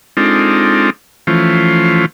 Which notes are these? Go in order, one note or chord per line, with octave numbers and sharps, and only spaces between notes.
G#3 C4 D4 D#4 F4 A4
E3 F3 A3 C#4 F4 C5